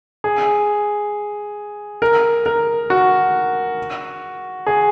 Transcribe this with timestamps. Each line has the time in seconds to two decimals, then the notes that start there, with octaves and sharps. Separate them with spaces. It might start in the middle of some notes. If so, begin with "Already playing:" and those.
0.24 G#4
2.02 A#4
2.46 A#4
2.90 F#4
4.67 G#4